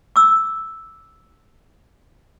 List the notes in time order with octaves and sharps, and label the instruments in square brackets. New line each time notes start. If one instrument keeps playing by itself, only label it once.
[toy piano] D6 E6